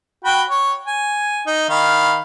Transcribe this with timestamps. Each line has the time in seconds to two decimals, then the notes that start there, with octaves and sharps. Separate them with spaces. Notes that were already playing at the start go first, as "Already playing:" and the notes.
0.24 F#4 G5 B5
0.50 C#5
0.87 G#5
1.47 D#4
1.69 D#3 F5 B5